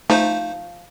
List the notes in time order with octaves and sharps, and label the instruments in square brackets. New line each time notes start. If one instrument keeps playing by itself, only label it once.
[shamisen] F3 [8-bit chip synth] A3 D#4 C5